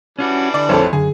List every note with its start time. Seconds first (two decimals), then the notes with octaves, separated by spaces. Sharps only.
0.19 E3 G3 C#4 D4 F4 F#4
0.54 D3 D5
0.69 A1 F2 A4 C5 C#5
0.93 F#2 D3 G#4